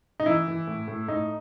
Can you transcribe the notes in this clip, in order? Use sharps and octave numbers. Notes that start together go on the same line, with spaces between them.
D#4
E3 E4
E3
A2
A2
A2 D#4